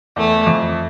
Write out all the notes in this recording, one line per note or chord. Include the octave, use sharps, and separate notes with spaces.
E2 A3
F2